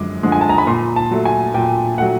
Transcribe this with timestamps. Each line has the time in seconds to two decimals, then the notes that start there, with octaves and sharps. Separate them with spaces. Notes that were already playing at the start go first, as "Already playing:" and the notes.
Already playing: F#2 D3 F3 G#3 D6
0.23 D3 F3 G#3
0.32 G#5
0.41 A5
0.49 A#5
0.58 B5
0.67 A#2 C6
0.96 A5
1.11 F#3 A3
1.25 G#5
1.54 A#2 G5
1.98 F#3 A3 F#5